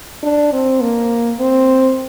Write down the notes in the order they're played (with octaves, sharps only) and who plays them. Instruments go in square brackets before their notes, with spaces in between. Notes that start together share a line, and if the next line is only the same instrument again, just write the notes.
[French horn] D4
C4
A#3
C4